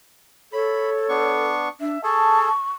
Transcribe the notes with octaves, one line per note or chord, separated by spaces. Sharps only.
A4 C#5 B5
B3 D4 C#6
D4 E5
G#4 A4 A5 C#6